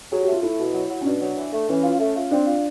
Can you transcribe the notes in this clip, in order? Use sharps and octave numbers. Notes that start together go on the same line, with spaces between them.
F#3 G#4
G4
A3 F4
A3 E4
B2
F#3
F#3
C#4
B2 D4
F#3
E3
A3
E3 C#4
F4
A3
F4
C4 D4
F4